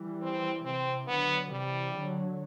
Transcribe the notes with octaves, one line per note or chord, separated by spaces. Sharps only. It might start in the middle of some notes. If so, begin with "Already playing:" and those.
Already playing: E3 G3
C4
C3 E3 C4
D3 F#3 B3
C3 E3 G3
D3 F#3